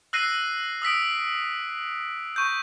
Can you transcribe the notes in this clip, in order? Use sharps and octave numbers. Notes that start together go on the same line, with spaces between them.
E6 F#6 A#6 C7 D#7
D#6 E6 B6 D7
C#6 G6